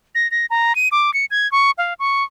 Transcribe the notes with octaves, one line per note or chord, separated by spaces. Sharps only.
A#6
A#6
A#5
D#7
D6
C#7
G#6
C#6
F5
C#6